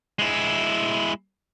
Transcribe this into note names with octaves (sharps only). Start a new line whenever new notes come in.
G#3 E4